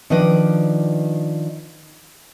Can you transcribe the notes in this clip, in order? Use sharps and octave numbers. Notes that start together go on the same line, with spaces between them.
D#3 F3 D4 B4 D5 D#5